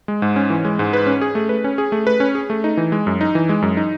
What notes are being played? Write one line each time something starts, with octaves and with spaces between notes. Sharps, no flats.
G#3
G#2
C#4
E3
G#3
G#2
B4
C#4
G#4
A3
B4
C#4
G#4
A3
B4
C#4
G#4
A3
D#4
E3
G#3
F#2
D#4
E3
G#3
F#2
D#4